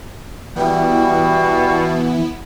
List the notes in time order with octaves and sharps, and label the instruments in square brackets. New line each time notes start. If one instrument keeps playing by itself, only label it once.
[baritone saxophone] B2 [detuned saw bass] E3 [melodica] G3 [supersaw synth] B3 E4